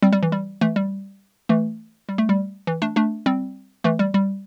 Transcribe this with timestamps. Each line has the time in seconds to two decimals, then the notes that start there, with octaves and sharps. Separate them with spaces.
0.02 G3 C4
0.13 G3
0.23 E3
0.32 G3
0.61 E3 A3
0.76 G3
1.49 E3 A3
2.09 G3
2.18 A3
2.29 G3
2.67 E3
2.82 A3 D4
2.96 A3 D4
3.26 G3 C4
3.84 E3 A3
3.99 G3
4.14 G3